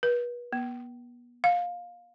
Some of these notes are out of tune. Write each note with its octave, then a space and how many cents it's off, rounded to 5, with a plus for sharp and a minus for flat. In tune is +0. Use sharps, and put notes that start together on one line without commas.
B4 -35
B3 -35
F5 +15